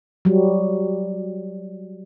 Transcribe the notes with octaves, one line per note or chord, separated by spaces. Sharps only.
F#3 G3